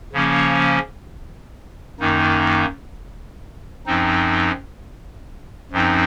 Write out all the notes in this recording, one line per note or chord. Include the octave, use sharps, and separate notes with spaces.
C#3 F3 A#3 C#4
F#2 D#3 A#3 D#4
F#2 F3 C4 D#4
F#2 F3 C4 D#4